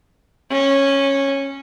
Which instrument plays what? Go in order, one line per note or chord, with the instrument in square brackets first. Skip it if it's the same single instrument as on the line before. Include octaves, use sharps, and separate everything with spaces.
[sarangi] C#4